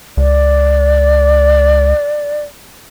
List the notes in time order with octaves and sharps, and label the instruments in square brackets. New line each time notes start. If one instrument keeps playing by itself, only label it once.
[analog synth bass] C#2 [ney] D5